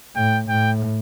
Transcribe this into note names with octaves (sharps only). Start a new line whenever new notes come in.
A2 G5
A2 G5